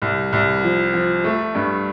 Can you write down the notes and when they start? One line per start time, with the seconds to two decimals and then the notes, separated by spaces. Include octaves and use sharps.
0.02 C2
0.33 C2
0.63 F3
0.94 F3
1.24 A3
1.55 G2